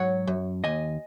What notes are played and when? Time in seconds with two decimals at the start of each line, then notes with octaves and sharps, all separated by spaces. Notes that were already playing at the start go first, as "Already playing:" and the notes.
Already playing: G#2 F#3 C#5 F#5
0.27 F#2
0.64 D#2 D#5 G#5